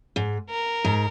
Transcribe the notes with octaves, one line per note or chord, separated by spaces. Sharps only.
G#2
A#4
G#2